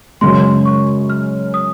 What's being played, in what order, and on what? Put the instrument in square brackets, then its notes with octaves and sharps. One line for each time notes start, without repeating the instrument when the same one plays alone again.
[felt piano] F#2 C#3 G#3 [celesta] C6
[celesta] C#6
F6
D#6